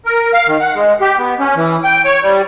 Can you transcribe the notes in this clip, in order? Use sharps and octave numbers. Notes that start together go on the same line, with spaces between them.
A#4
F5
D#3
F#5
G#3
G4
B3
C#4
E3
G5
C#5
G3